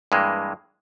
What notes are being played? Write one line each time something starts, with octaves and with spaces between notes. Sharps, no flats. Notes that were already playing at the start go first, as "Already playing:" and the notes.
G2 E3 G#3 A#3